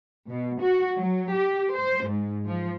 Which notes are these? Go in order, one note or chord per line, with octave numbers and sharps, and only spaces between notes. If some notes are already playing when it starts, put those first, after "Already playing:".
B2
F#4
F#3
G4
C5
G#2
F3